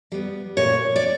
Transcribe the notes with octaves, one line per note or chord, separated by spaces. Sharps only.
G3 B3
A#2 C#5
D5